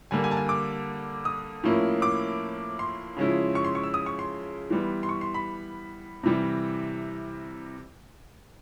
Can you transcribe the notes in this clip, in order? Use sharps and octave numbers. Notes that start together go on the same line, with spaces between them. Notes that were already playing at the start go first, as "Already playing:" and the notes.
D3 G3 A#3 G#5
G#5
A5
G#5
D6
D#6
A2 F3 A#3 C#4 E4
D6
C6
C#3 F3 G#3 C#4 E4
C#6
C6
C#6
E6
D#6
C#6
C6
E3 G3 B3
C6
C#6
C6
B5
C3 E3 G3